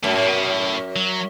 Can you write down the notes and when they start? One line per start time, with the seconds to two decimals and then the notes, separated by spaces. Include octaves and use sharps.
0.03 F#2 A2
0.15 A2
0.27 B2
0.50 A2
0.96 F#3